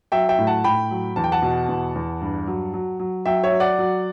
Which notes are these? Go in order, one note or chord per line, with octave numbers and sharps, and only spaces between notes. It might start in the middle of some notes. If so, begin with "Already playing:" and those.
F#3 E5 G5
E5 G5
A2
F#5 A5
A2 G5 B5
F#3
E2 A5
G5
F#5 A5
B2
E2
E2
G2
F#3
F#3
F#3
F#3 E5 G5
C#5 E5
F#3
D5 F#5
F#3